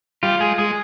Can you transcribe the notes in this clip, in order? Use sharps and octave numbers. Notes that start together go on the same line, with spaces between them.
G3 F4
G#3 G#4
G#3 G#4